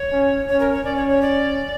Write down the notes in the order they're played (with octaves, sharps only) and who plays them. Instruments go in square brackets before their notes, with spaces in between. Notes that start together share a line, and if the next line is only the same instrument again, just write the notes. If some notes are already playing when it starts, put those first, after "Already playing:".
Already playing: [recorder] C#5
[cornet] C#4
[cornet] C#4 [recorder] C#5
[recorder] A#4
C#5
[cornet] C#4 [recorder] D5
[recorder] C#5
C#5
D5